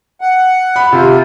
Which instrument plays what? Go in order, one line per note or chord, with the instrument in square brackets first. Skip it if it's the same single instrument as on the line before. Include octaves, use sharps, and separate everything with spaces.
[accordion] F#5
[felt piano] B5
[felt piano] C3 [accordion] F4